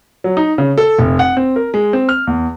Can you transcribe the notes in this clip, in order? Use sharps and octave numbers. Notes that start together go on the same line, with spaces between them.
F#3
D#4
C#3
A4
F1
F#5
C4
A#4
G#3
C4
F6
E2